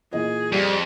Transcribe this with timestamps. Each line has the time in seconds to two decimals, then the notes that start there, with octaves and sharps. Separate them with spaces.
0.13 A#2 E3 G#4 D#5
0.52 F2 G3